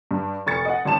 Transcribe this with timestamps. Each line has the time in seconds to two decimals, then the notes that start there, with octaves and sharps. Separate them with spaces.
0.11 G2
0.46 F1 C#6 A6 C#7
0.65 D#5 F#5
0.85 G#1 C#4 A5 E7